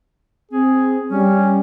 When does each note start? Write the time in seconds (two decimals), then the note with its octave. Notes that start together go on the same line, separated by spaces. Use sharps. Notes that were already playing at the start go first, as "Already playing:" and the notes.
0.51 C4 G#4
1.10 G3 C#4